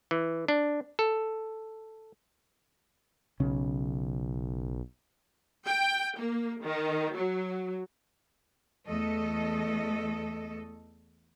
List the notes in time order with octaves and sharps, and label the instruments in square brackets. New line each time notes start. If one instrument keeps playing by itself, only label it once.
[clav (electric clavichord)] E3
D4
A4
[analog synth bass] B1 [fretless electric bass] C#3 C#4
[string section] G5
A#3
D#3
F#3
[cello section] E2 A3 A4 D#5